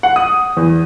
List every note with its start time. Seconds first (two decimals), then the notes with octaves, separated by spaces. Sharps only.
0.03 F#5
0.16 D#6
0.57 E2